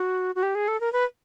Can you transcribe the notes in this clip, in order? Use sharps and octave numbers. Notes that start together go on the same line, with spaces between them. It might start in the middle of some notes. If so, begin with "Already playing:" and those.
Already playing: F#4
F#4
G4
G#4
A4
A#4
B4